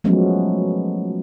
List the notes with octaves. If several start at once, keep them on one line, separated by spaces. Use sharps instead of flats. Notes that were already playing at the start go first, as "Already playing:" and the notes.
F3 F#3 G#3 A3 B3 C#4